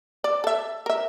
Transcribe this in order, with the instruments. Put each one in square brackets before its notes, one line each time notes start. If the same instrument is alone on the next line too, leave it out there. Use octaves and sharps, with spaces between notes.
[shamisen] D5
A4 E5
A#4 E5